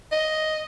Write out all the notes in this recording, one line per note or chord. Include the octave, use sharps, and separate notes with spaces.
D#5